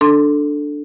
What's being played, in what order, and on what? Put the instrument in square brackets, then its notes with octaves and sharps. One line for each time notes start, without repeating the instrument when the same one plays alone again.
[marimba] D4 A4 C6